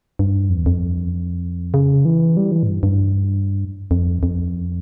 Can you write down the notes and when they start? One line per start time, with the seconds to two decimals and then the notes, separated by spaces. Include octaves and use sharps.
0.19 G2
0.50 F2
0.57 E2
0.66 F2
1.74 C#3
2.05 E3
2.37 G3
2.52 E3
2.63 A2
2.67 G2
2.83 G2
3.91 F2
4.23 F2